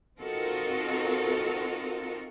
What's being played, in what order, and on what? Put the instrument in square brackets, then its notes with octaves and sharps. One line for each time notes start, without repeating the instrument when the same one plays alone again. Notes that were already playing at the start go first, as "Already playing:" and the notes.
[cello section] C4 D#4 F4 F#4 A4 A#4